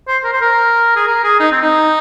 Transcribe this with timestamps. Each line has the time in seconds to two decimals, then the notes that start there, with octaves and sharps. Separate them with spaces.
0.08 C5
0.24 A#4
0.33 C5
0.42 A#4
0.96 G#4
1.07 A#4
1.24 G#4
1.40 D#4
1.51 C4
1.62 D#4